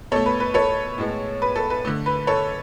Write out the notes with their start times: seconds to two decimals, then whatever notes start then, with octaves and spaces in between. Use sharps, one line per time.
0.12 B2 A3 A4 C#5
0.26 B4
0.40 B4
0.54 A4 C#5
0.98 A2 G#3 B3
1.42 B4
1.56 A4
1.70 B4
1.85 D3 A3
2.06 B4
2.27 A4 C#5